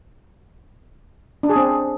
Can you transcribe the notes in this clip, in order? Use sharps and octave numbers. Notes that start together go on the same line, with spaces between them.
D4
G#4
C4